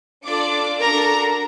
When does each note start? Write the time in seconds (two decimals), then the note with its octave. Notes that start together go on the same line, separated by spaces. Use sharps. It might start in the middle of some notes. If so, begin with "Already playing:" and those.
0.25 D4 F4 A4 D5 D6
0.79 D4 F#4 A4 A#4 A#5